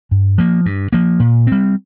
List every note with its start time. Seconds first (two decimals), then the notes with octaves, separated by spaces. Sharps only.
0.11 G2
0.38 F3 A#3
0.66 G2
0.93 F3 A#3
1.20 A#2
1.47 G3 C4